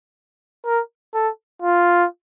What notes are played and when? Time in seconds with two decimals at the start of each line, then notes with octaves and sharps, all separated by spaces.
0.66 A#4
1.14 A4
1.62 F4